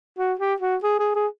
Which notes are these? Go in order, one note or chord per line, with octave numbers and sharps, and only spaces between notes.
F#4
G4
F#4
G#4
G#4
G#4